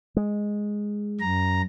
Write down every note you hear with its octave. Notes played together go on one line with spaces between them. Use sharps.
G#3
F#2 A#5